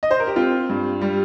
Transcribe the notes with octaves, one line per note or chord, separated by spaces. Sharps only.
D#5
C5
A#4
G4
C4 F4
G2
G3